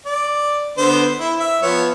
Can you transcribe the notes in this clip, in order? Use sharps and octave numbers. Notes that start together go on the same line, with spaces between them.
D5
D3 B3 C5
E4
E5
F3 B3 C#5